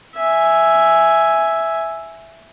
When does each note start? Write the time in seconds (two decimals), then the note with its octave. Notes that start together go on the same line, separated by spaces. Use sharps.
0.15 E5 G#5